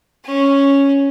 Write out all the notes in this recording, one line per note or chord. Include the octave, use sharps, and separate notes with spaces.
C#4